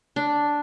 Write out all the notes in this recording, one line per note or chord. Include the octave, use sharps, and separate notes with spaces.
D4